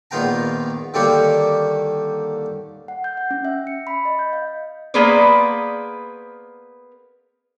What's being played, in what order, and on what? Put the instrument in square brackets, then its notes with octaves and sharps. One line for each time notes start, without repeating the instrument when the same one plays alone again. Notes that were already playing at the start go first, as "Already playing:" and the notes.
[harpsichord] A#1 D#3 B3 F4 G5 A#5
D3 D#3 G3 A#3 G4 C#5
[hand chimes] F#5
G6
F#5
C#4
E5
C#7
B5
D#5
G6
F5
[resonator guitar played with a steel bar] A#3 B3 G#4 B4 C5 D5